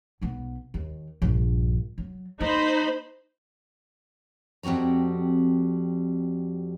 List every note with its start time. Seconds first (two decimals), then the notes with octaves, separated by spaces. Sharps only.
0.21 B1 B3
0.74 D#2
1.22 A#1 G2
1.98 F#3
2.41 A#3 D#4 C5 B5
4.63 F2 G3 C4 F#4 A#5